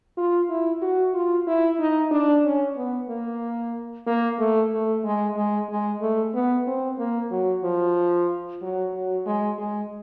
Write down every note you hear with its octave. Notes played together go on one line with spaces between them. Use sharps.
F4
E4
F#4
F4
E4
D#4
D4
C#4
B3
A#3
A#3
A3
A3
G#3
G#3
G#3
A3
B3
C4
A#3
F#3
F3
F#3
F#3
G#3
G#3